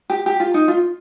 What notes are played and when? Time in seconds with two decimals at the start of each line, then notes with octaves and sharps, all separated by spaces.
0.10 G4
0.26 G4
0.40 F4
0.54 D#4
0.68 F4